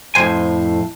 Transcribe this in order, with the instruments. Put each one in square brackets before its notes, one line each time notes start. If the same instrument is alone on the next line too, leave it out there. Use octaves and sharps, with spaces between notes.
[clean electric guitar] F2 A2 F#3 C5 G#5